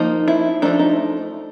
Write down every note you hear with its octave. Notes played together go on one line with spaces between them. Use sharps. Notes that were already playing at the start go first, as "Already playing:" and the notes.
Already playing: F3 A#3 D#4
E4
F3 A3 D4 D#4
D#4